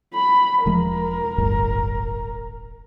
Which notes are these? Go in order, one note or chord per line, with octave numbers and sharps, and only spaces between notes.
B5
E1 F3 G#3 A#4
D1 G1 G2